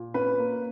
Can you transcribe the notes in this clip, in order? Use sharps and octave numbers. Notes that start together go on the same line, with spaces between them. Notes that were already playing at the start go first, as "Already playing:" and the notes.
Already playing: A#2
C#4 B4
A#3